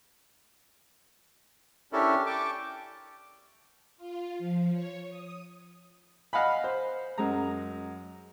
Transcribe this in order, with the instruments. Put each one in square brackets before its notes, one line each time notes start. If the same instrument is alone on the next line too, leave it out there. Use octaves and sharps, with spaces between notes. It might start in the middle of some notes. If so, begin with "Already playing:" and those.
[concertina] C#4 E4 A4 [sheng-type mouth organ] D4 G4 A#4
[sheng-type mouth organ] G5 A5 C#6 [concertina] D6
[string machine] F4
F3
C#5
D#6
[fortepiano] D#5 F5 F#5 G#5 B5
C5
F#2 G#3 A#5